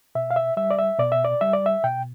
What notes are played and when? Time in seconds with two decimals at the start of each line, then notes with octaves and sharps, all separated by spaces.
0.15 B2 E5
0.31 F5
0.36 E5
0.57 G3 E5
0.71 D5
0.79 E5
0.99 B2 D5
1.12 E5
1.25 D5
1.41 G3 E5
1.53 D5
1.66 E5
1.84 B2 G5